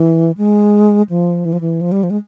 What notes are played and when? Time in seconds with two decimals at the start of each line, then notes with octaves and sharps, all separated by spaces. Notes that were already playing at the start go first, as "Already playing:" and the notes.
Already playing: E3
0.38 G#3
1.10 F3
1.45 E3
1.53 F3
1.61 E3
1.81 F3
1.92 G3
2.03 F3
2.10 G#3